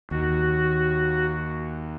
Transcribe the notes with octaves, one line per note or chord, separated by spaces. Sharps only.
D#2 F#4